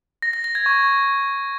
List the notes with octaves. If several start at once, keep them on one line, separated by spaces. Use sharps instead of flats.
A#6
A#6
A#6
G#6
C#6